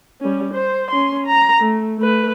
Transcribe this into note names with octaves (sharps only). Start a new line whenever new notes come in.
G3 C#4
C5
C#4 C6
A#5
A3
A3 B4